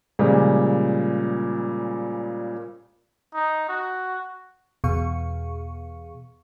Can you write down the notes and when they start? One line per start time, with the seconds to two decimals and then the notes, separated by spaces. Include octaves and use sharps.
0.19 A#2 C#3 F3 G3 G#3
3.34 D#4
3.69 F#4
4.84 E2 B2 G#4 F5 C#6